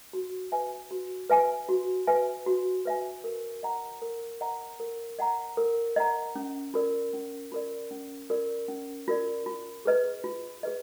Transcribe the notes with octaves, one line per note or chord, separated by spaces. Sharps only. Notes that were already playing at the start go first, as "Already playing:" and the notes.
F#4
B4 E5 G#5
F#4
B4 E5 G#5
F#4
B4 E5 G#5
F#4
B4 E5 G#5
A#4
D#5 F#5 A#5
A#4
D#5 F#5 A#5
A#4
D#5 F#5 A#5
A#4
D#5 F#5 A#5
C#4
F4 A#4 D5
C#4
F4 A#4 D5
C#4
F4 A#4 D5
C#4
F4 A#4 D5
F4
G#4 B4 D#5
F4
G#4 B4 D#5